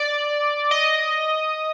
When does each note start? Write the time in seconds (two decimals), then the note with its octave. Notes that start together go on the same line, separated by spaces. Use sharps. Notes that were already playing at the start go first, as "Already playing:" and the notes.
Already playing: D5
0.71 D#5